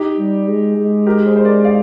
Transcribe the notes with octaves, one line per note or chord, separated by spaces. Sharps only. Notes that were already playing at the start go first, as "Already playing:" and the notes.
Already playing: D#4 G4
G3
G#3
G#3
G4 A#4
G#4 C5
C5
A#4 D5
D5 F5